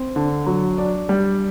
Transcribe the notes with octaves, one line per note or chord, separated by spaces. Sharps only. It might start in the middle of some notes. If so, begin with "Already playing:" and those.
Already playing: C4
D3
F#3
D4
G3